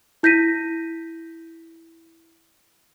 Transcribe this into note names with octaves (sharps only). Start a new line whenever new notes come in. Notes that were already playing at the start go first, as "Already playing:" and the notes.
E4 G6 A#6 B6 D#7